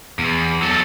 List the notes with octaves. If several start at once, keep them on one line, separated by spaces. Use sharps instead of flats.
E2
F#3 A4